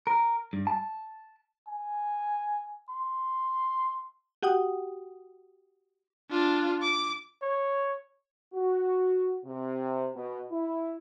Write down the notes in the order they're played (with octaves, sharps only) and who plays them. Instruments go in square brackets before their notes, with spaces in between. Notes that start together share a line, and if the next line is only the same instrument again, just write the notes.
[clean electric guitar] A#4
G2
A5
[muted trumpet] G#5
C6
[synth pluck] F#4 G4 F#5 G5 D#6
[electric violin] D4 F4
D6
[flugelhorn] C#5
[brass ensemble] F#4
C3
B2
E4